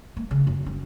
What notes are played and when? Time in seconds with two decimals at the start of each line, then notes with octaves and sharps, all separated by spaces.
0.17 A#3
0.31 C#3
0.47 F#2
0.66 C#4